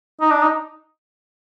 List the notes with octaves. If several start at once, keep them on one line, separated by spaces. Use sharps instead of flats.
D#4
D4
D#4